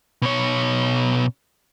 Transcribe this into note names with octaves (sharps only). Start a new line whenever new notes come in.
B2 C#5